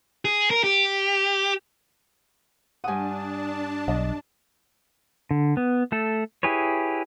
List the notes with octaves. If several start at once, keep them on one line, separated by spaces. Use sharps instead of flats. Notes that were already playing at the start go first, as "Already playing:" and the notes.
G#4
A#4
G4
G2 D4 F#5 G#5 A5 D#6
B1 D#5
D3
B3
A3 A4
E4 G4 G#4 B4 C#5